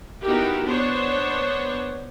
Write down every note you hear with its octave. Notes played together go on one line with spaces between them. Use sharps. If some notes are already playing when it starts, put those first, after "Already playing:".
B3 D#4 E4 F#4 G4 A#4
B3 D4 C5 C#5